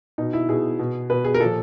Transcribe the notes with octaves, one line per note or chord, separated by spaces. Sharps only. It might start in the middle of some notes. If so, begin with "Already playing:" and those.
B2 D#4
E4
B2 G#4
B2
B2 B4
G#4
A#4
A#2 F3 A4